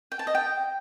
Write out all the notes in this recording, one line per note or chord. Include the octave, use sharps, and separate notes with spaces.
G5
A5
D#5
G5